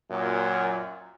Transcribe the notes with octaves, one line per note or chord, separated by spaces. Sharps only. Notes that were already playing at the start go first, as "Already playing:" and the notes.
F#2 A#2